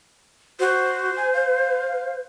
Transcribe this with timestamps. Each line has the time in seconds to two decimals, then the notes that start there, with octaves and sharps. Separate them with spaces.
0.60 F#4 C5
1.17 G#5
1.34 F5